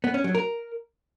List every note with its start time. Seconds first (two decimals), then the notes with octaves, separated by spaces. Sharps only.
0.04 B3
0.14 C#4
0.24 F#3
0.35 A#4